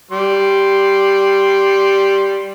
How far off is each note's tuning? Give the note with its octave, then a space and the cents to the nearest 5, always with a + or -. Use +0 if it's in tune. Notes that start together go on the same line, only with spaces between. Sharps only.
G3 +0 C6 +0